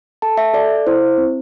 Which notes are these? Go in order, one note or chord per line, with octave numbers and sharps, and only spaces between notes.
A4 A5
E5
A4 D5
E4 C5
C4